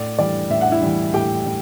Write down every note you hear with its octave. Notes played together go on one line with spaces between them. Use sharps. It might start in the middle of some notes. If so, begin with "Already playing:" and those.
Already playing: A2 D5
E3 G3 D5
A2 E5
F#5
E4 E5
E3 G3
A2 G4 G5
G3